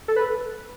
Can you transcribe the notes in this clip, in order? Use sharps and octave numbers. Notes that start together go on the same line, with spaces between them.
A4
B4